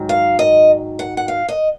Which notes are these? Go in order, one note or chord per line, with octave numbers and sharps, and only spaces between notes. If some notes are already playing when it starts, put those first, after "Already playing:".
Already playing: G#2 D#3 F#3
F5
D#5
F#5
F#5
F5
D#5